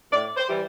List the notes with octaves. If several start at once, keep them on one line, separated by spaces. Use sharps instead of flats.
A2 D5
C5
E3 G3